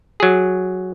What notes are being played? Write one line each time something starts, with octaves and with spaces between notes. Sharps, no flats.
F#3 G#4